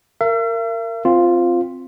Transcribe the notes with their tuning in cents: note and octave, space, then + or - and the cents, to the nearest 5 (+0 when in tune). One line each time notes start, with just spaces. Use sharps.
A#4 -20 E5 +45
C4 +0 F4 +0